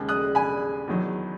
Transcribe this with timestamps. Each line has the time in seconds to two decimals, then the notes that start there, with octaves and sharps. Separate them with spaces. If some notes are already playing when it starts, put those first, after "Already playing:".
Already playing: D#2 C#3 G#3
0.09 D#6 F#6
0.35 G#5 B5
0.88 E2 D#3 F#3